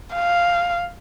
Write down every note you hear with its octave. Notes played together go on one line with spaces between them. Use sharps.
F5